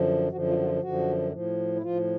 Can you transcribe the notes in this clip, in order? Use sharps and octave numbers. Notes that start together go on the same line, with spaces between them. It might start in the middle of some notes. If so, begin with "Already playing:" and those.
Already playing: F#2 D3 F3
F#2 D3 F3 F#4
F4
F#4
F4
F#2 D3 F3 F#4
A2 F3
E4
A2 F3 F4